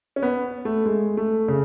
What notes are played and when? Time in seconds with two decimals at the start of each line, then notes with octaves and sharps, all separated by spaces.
0.16 C#4
0.23 B3
0.65 A3
0.86 G#3
1.17 A3
1.48 C#3